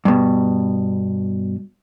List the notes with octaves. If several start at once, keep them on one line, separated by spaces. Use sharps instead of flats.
G2 B2